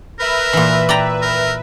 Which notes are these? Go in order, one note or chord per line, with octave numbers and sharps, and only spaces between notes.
A#4 B4 E5
A#2 E3
D5 G5 A#5
A#4